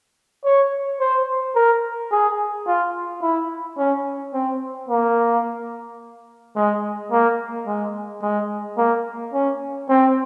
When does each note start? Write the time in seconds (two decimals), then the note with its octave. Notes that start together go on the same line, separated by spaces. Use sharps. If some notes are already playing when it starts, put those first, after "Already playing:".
0.45 C#5
1.00 C5
1.55 A#4
2.12 G#4
2.67 F4
3.22 E4
3.78 C#4
4.33 C4
4.89 A#3
6.56 G#3
7.11 A#3
7.67 G#3
8.22 G#3
8.78 A#3
9.33 C#4
9.89 C4